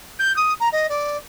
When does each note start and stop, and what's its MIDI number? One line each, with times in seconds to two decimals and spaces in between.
0.19 0.35 91
0.36 0.53 87
0.60 0.68 82
0.72 0.86 75
0.89 1.17 74